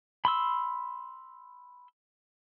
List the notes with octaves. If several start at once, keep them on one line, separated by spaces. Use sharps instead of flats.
B5 C6 E6